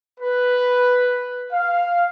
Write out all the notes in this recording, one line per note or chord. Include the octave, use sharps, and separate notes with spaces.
B4
F5